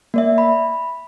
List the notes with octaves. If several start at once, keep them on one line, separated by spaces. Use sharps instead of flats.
A#3 D5 E5
B5